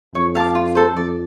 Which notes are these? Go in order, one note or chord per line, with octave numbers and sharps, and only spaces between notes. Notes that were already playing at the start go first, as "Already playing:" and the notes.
F2 C#5
F5 A5 D6
F4
A4 C5
F2 D5